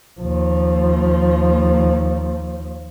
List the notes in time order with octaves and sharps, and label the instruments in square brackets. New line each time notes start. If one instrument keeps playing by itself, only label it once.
[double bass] D#2 F3